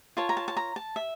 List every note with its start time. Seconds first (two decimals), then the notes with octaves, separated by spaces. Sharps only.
0.17 F4 A#4 C#5 A5
0.29 A#5
0.37 A5
0.48 A5
0.57 A#5
0.76 A5
0.96 E5